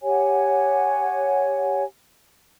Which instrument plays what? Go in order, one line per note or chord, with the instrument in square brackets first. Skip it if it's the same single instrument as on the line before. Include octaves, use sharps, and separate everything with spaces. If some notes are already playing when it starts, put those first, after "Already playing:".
[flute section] G4 C#5 F#5 G#5